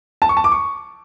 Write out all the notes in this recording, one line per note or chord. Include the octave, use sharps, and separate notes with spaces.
A5
C#6
A5
D6
C#6